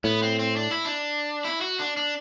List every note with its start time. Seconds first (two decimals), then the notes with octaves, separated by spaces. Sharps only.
0.04 A2 B3
0.23 C4
0.39 C4
0.56 D4
0.71 E4
0.85 D4
1.45 E4
1.61 F#4
1.79 D4
1.97 D4